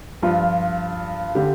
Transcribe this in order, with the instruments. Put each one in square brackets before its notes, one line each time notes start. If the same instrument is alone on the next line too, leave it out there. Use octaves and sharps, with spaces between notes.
[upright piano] G2 F3 F4
D3 G3 G4